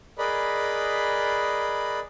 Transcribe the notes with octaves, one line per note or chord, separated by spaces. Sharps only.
G#4 A#4 B4 D5 D#5 B5